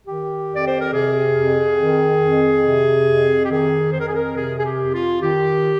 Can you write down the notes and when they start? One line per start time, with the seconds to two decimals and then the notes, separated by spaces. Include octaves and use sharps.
0.07 D#3 G4
0.51 F2
0.56 D5
0.67 C5
0.81 A#4
0.93 C3 G#4
1.36 F2
1.79 D#3
2.22 F2
2.65 C3
3.07 F2
3.45 G4
3.51 D#3 G#4
3.93 F2 C5
4.00 A#4
4.08 G#4
4.15 A#4
4.36 C3 G#4
4.59 G#4
4.65 G4
4.79 F2
4.94 F4
5.22 D#3 G4